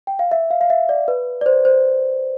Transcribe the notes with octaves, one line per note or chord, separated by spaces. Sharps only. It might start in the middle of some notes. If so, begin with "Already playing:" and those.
G5
F5
E5
F5
F5
E5
D5
B4
D5
C5
C5